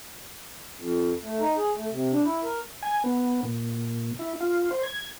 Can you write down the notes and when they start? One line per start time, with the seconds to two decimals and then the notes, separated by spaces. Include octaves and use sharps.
0.77 F2
1.22 A3
1.39 D#4
1.57 G#4
1.75 A3
1.90 C3
2.12 D4
2.24 E4
2.43 A#4
2.83 G#5
3.04 B3
3.43 A#2
4.19 E4
4.41 F4
4.71 C5
4.83 G#6